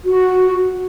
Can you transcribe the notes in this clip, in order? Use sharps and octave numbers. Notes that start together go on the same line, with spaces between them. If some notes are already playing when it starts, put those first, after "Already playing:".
F#4